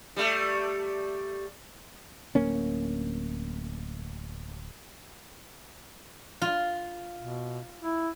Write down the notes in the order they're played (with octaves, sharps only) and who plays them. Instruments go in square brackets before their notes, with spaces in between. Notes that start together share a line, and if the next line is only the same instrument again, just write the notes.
[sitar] G3 A3
[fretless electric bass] D1 A#3 C#4
[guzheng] F4
[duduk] B2
E4